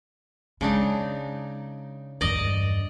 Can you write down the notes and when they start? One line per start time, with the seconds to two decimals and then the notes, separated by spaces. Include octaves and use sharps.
0.61 C#3 G#3 D4 D#4
2.21 E2 G2 D5 D#5